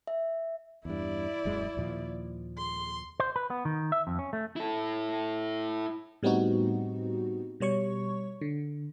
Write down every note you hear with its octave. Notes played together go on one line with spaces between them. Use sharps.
E5
E2 G2 E4 D5
D#1 F#2 G#3
D#2 A#2 F3
C6
C5
B4
B3
D#3
E5
F2
C#4
A3
E4 A4
A2 G3 B3 C4 D#4 F#4
B2 G3 C#5 C#6
D3